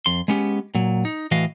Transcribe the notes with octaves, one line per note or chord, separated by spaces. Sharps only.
F2 C6
G#3 B3 C#4 G4
A#2 F#3
D#4
A2 E3 F#4 D#5 F5